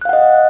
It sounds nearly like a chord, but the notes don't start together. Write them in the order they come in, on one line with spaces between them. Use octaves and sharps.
F#6 F5 F#5 D#5